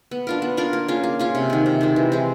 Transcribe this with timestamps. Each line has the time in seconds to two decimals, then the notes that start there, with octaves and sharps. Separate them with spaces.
0.11 B3
0.27 D4 F4 A#4
0.42 B3
0.57 D4 F4 A#4
0.73 A#3
0.88 C#4 F4 G#4
1.04 A#3
1.19 C#4 F4 G#4
1.35 C3
1.50 D#3 G#3
1.66 C3
1.81 D#3 G#3
1.96 E3
2.12 G#3 C4